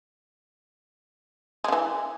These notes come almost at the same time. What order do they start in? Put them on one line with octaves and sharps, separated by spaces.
G#3 C#3 E3